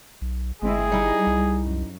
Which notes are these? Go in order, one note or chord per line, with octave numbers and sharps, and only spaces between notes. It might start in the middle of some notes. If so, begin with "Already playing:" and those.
B1
G1 G#3 C4 E4 G#4
G3 D#4 E4
C2
F#2